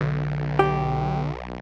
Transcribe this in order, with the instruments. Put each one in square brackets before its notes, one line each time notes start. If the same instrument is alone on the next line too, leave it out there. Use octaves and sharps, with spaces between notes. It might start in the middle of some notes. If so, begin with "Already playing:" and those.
[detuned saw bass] B1 [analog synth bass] D3
[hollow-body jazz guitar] G4